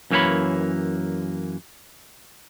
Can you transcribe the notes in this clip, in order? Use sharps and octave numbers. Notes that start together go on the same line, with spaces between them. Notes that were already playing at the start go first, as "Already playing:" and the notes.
F#2 E3 A#3 G4 C#5 B5